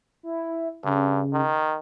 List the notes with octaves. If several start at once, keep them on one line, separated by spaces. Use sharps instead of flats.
E4
G2 C#3
D#3